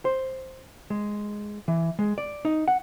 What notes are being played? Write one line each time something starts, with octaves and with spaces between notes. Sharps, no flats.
C5
G#3
E3
G#3
D5
D#4
F#5